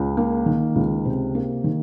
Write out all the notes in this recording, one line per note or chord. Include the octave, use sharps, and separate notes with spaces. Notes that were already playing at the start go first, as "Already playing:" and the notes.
Already playing: C#2
A#3
D#3
C#2
C3
A#3
D#3